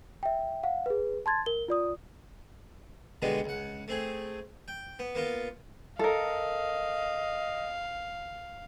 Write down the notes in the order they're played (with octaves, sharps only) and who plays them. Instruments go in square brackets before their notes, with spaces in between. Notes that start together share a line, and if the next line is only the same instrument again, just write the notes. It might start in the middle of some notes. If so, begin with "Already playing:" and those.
[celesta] E5 G5
F5 F#5
G#4 B4
A5 C6 G#6 A6
A#4 G7
F4 D5 D#6
[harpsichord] B2 D3 G3 G#3 B3
C#2 F#5
A3 C4 G#4
G5
B3
A#3 B3 F4
[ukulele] A4 A#4 [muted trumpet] D#5 [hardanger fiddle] F5